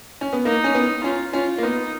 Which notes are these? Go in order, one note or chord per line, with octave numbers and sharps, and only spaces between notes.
C#4
B3
A#3 D#4
C#4
B3
C#4 F4
C#4 F4
A#3
B3 D#4